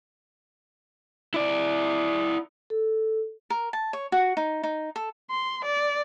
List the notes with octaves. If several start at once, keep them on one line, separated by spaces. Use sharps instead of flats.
E4 D5
A4
A#4
A5
C#5
F#4
D#4
D#4
A4
C6
D5